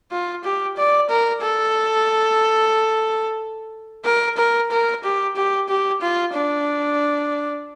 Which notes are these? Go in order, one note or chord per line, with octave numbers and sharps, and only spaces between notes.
F4
G4
D5
A#4
A4
A#4
A#4
A#4
G4
G4
G4
F4
D4